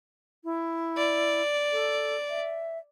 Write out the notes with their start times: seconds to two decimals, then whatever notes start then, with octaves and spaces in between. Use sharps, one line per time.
0.45 E4
0.97 D5
1.72 A4
2.30 E5